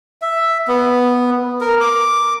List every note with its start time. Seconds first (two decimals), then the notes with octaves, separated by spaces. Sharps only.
0.22 E5
0.68 B3
1.61 A#4
1.80 D6